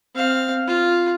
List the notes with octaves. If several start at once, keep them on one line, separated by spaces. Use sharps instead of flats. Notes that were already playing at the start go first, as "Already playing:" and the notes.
C4 F5
F4